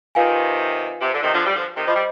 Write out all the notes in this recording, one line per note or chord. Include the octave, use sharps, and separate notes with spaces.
C3 D#3 F4 B4 F5 G#5
C3
D3
C3 D#3
D3 F3
G3
D3 F3
C3 D#3
F3 C5 D#5 B5 D6
G3